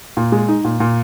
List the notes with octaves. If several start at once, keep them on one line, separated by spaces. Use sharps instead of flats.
A#2
G#3
D#4
A#2
A#2